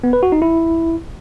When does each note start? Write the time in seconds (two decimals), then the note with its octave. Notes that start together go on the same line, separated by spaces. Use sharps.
0.04 B3
0.13 B4
0.23 F#4
0.32 D#4
0.42 E4